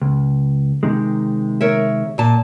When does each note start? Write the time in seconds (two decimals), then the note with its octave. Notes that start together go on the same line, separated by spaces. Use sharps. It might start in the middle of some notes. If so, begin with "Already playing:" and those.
0.02 C#2
0.83 C3 D#3 G#3
1.61 A#4 C#5 E5
2.18 A#2 A5